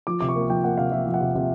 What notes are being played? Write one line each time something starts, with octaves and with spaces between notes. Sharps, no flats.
F3 D6
C3 D6
C#6
A#3
F3 G5
A#3 F#5
C3 F5
F3 E5
F3
F#5
C3
C3